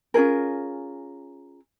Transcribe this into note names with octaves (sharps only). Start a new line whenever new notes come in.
C#4 F4 G#4 A#4